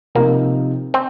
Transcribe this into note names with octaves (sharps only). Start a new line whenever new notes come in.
C3 F3 A#3 C4 D#4
C4